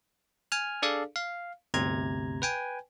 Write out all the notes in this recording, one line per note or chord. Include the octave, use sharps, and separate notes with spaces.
G#5 F6
D4 G#4 A4 D5 F5
F5
G1 D2 C3 A#5 G#6
B4 G5 G#5